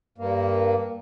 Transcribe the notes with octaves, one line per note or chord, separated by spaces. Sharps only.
G2 A#3